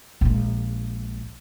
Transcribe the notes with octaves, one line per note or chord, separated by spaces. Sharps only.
A#1 G#3